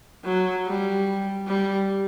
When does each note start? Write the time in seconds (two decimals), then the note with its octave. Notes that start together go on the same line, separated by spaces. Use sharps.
0.24 F#3
0.66 G3
1.47 G3